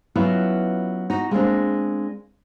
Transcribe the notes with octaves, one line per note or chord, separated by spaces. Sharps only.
F#3 B3 C#4 E4 F4
D#4 F#4
G#3 A#3 C4 D4